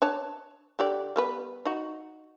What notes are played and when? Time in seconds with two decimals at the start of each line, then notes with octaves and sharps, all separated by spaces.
0.02 D4 C#5 A5
0.79 D3 G4 D5
1.16 G3 B3 B4
1.65 D#4 F#4